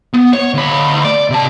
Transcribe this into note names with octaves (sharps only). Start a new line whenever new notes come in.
B3
C#5
D2 B5
D5
C3 A5